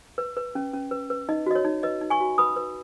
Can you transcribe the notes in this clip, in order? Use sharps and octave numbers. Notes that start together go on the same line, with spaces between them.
B4
B4
C#4
C#4
B4
B4
D#4 D#5
F#4 D#5
C#5
D#4
B4 D#5
D#4
G#5 C#6
F#4
B4 B5 D#6
B4